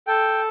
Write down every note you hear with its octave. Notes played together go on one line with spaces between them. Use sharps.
A4 G5